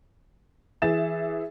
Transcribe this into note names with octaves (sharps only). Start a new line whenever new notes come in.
E3 G#4 E5 A6 E7